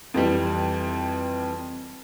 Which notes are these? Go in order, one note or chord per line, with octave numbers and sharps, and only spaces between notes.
F2 E3 G3